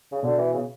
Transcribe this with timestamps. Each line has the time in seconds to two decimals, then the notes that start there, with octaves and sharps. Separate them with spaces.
0.12 C#3
0.23 B2 D3
0.38 E3
0.54 C#3